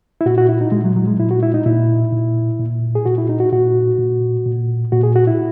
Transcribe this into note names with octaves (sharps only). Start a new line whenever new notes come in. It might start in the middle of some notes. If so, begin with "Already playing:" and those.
E4
A#2 F#4
F#4
E4
D#4
A#2 G#3
F#3
F#3
G#3
A#2 E4
F#4
E4
D#4
A#2 E4
A#2
A#2
G#4
A#2 F#4
E4
D#4
F#4
A#2 F#4
A#2
A#2
A#2 F#4
G#4
F#4
E4